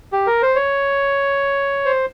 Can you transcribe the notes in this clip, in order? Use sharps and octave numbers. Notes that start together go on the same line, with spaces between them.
G4
A#4
C5
C#5
C5